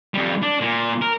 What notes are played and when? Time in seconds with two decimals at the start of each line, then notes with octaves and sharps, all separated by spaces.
0.14 F2 G3
0.42 D4
0.61 A#2
1.02 A#4